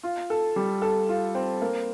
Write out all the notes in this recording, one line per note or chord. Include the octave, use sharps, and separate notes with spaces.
F4
A4
G3
A4
F4
C4
A#3